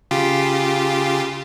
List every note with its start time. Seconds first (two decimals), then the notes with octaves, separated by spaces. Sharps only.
0.11 C#3 F4 G4